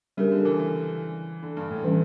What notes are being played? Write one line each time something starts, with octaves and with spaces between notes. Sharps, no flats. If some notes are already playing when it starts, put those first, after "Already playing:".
C#3 G3 D4 G4 A#4 C#5
D3
E3
E3
D3
G2
A2
E3 G3 C#4